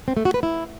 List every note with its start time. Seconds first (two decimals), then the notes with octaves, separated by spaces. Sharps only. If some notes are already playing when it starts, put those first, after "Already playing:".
0.08 C4
0.17 A3
0.25 F#4
0.34 B4
0.43 E4